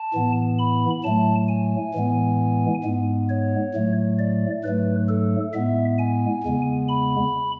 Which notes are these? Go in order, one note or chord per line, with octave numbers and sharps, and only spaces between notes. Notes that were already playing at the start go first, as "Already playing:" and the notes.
Already playing: A5
A2 E3 B3
B5
A2 F#3 A3 A5
G#5
A2 E3 G#3 B3
G#2 G#3 B3
C#5
A2 F#3 A3
D5
G#2 F#3 A3 B4
A4
A2 G#3 B3 E5
G#5
E2 C#3 G#3 B3
B5